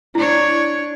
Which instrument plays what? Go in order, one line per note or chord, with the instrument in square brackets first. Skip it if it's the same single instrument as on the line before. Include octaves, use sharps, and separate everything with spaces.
[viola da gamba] D4 C#5 [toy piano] E4